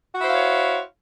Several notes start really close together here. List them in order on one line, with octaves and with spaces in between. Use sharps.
F#4 E4 C5 F5 C#5